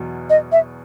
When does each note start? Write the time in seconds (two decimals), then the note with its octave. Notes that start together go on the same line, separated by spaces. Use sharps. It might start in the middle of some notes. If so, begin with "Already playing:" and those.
Already playing: E2 B2 F#3
0.30 D#5
0.52 E5